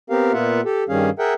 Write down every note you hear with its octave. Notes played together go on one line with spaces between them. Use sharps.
B3 C4 G4 A#4 F5
A#2 A#3 B3 F4 E5 F#5
G4 A4
G2 D#3 G3 C#4 G#4 F5
G#4 A#4 E5 F#5 G5